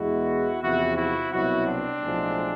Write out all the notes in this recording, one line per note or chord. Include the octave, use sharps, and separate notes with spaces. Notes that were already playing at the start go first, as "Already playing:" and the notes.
Already playing: E2 B2 G#3 E4 F#4
E2 C3 F3 E4 F#4
E4 F#4
C2 B2 F#3 E4 F#4
C4 D4
B1 A2 F3 G#3